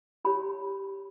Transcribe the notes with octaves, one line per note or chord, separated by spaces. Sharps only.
E4 G4 C#5 B5